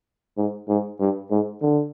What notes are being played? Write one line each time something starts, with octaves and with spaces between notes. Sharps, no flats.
G#2
G#2
G2
G#2
D3